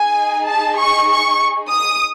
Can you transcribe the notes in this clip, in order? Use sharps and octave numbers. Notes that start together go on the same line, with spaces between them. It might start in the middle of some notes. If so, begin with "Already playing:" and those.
Already playing: D#4 G#4 G#5
A5
C#6
C#6
D#6